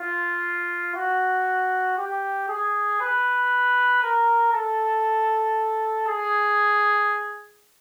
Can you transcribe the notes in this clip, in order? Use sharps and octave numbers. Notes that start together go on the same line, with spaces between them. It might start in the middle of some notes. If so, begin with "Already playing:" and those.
Already playing: F4
F#4
G4
G#4
B4
A#4
A4
G#4